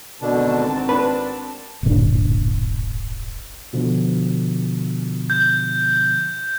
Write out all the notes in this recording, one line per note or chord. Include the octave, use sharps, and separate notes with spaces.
G#1 B2 D3 C4 D4 F#4 A#4 A5
D4 B4
D1 G1 A#2 D4
B2 D3 F3
G6